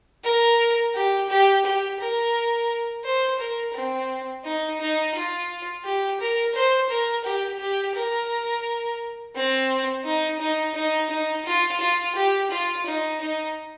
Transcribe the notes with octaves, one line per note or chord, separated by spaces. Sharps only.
A#4
G4
G4
G4
A#4
C5
A#4
C4
D#4
D#4
F4
G4
A#4
C5
A#4
G4
G4
A#4
C4
D#4
D#4
D#4
D#4
F4
F4
G4
F4
D#4
D#4